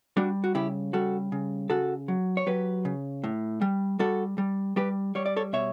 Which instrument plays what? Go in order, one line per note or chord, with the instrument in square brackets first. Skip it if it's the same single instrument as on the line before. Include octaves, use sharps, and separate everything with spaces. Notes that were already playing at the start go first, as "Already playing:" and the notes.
[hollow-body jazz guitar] G3 D4 F#4
F#4
C#3 E4 G4
G3 F#4 A4
C#3
C#3 F#4 A4
F#3
C#5
F#3 G4 B4
C#3
A2
G3
G3 F#4 A4
G3
G3 G4 B4
G3 C#5
D5
A4 C#5
B2 C#5 E5